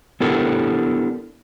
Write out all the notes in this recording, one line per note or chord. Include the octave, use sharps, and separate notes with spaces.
B3 D4 E4 G4 A4 A#4